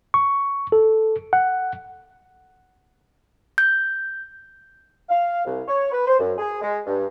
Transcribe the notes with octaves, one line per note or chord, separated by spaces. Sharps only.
C#6
A4
F#5
G6
F5
C2
C#5
B4
C5
F#2
G#4
G#3
G2